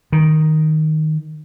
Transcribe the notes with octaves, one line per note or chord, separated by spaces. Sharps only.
D#3